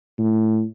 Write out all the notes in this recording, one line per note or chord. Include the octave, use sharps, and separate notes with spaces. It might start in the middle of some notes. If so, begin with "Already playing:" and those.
A2